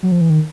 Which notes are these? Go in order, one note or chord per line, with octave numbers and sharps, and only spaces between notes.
F#3
F3
E3
D#3